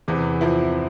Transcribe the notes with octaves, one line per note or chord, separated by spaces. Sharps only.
E2 C3 E3
F3 C4 E4